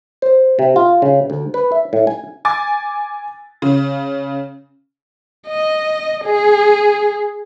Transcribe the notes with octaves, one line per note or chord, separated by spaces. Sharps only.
C5
C3
F4
C#3
D2
B4
E5
A2
G#5
G#5 D6 A6
C#3
D#5
G#4